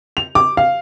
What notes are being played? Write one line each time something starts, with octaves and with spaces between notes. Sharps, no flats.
F7
D6
F5